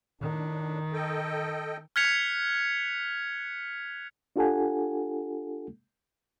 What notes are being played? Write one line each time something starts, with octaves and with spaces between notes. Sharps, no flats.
A2 D#3 D4
A4 D#5 G5
F6 F#6 G#6 B6 C#7 F7
D4 F4 G4 A4 F#5 G#5